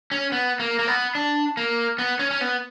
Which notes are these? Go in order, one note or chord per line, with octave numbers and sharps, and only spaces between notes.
C#4
B3
A#3
A#3
B3
D4
A#3
B3
C#4
C#4
B3